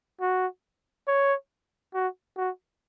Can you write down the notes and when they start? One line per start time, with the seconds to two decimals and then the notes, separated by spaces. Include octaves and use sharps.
0.21 F#4
1.08 C#5
1.95 F#4
2.37 F#4